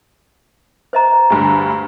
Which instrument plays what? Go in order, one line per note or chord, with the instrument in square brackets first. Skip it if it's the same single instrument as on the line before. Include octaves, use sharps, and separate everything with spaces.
[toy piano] C5 D#5 A#5
[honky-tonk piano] D2 G2 D3